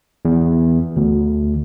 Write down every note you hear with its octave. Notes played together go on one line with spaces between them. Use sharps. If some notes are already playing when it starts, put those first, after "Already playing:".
E2
D2